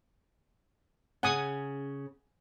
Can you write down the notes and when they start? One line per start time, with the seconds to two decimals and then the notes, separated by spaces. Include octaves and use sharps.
1.23 C#3 C#4 F#5 G#5 D#6